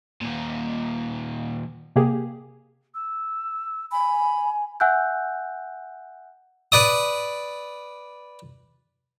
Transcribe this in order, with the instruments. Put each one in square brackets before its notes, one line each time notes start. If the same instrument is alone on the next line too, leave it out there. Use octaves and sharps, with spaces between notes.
[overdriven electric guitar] D#2 A#2
[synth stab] C3 A#3 G4 G#4
[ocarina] E6
[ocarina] G#5 [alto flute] B5
[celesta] E5 F#5 G#5 E6 F#6 G6
[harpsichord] B4 D5 D#6